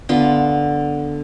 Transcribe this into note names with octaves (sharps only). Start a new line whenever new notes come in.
D3 B3 F4